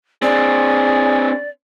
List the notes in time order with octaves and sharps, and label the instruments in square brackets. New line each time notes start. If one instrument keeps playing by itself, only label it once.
[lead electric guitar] C4 D4 [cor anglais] G#4 [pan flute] D5